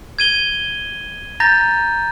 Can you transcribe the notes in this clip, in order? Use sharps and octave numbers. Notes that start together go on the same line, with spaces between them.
G#6 D#7 G7
A#5 G6 A6 A#6